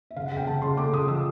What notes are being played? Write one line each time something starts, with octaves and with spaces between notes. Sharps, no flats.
E5
C#3 F5
F#5
C#3
G5
C#3 A5
C#3 C6
A3 D6
C#3 D#6
F3 E6